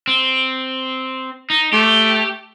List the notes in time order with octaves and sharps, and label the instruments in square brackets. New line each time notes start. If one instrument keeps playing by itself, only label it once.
[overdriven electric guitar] C4
D#4
[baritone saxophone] A3 [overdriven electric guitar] G4